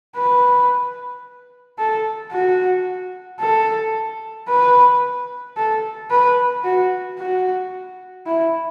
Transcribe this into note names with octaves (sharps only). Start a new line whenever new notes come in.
B4
A4
F#4
A4
B4
A4
B4
F#4
F#4
E4